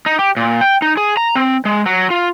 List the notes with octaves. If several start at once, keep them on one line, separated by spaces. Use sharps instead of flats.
D#4
G4
A#2
G5
D#4
G#4
A#5
C4
G#3
F#3
F4